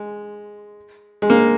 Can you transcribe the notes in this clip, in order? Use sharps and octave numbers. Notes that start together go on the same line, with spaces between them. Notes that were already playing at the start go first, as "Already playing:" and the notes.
Already playing: G#3
G#3
A#3